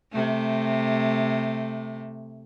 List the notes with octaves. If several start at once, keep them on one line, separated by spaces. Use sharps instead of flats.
C3 A3